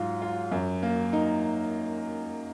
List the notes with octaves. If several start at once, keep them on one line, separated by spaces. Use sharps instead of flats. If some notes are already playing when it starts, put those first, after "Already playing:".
Already playing: G#2 F#3 F4
F4
F#2
A#3
D#4